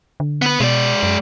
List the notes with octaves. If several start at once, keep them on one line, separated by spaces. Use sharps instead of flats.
D3
B3 B4
B2 G#3 D5
F#2